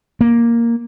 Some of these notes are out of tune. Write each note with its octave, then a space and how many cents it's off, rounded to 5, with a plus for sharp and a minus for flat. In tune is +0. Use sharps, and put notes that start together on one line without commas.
A#3 +0